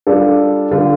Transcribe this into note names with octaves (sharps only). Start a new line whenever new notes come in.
G3 D4 F4 A4
D3 G3 F4 A4